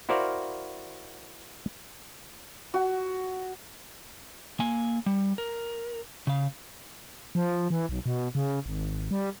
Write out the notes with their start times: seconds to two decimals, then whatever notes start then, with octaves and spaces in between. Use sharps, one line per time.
0.09 E4 F#4 A#4 C5 D5 F5
2.74 F#4
4.60 A#3 G#5
5.06 G3
5.38 A#4
6.27 C#3 F5
7.35 F3
7.70 E3
7.89 B1
8.06 B2
8.35 C#3
8.66 G#1
9.11 G3